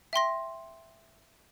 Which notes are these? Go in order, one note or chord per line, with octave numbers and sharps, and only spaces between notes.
E5 G5 C6 A#6